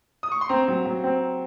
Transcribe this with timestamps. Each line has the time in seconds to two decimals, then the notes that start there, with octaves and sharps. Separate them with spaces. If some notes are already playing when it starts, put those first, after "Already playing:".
0.23 D#6
0.32 C#6
0.41 C6
0.49 C4 A#5
0.68 F#3
0.86 F#3
1.04 C4